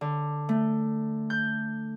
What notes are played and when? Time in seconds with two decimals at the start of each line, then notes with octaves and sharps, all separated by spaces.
0.01 D3
0.49 A3
1.30 G6